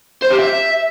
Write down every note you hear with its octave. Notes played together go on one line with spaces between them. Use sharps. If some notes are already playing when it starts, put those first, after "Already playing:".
C5
G4
E5